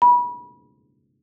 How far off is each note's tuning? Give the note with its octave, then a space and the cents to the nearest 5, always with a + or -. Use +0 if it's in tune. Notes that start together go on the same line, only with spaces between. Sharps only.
B5 -30